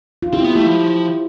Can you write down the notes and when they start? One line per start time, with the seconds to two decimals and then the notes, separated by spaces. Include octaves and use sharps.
0.23 F4
0.33 C4 E4 G4
0.44 B3
0.56 A3 E4 G4
0.66 F3